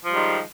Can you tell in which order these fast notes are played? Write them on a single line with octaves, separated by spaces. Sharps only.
F3 G3 G#3 D#3